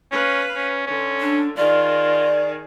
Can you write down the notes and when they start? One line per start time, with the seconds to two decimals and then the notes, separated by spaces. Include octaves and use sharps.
0.11 C#4 B4 F5
0.55 C#4
0.87 D3 C#4
1.21 D4
1.57 D#3 F4 G#4 D5